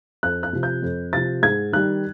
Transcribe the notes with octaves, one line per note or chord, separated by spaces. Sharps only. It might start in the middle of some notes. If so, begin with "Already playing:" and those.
F2 F#6
F#6
C3 F3
G6
F2
C3 F3 A6
G#2 G#6
D#3 G3 F#6